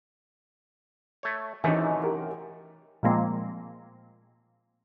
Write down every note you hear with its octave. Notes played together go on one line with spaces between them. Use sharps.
A3 C#5
F#2 C3 E3 A3 D#4
G4 A#4
A#2 F3 G#3 A#3 C4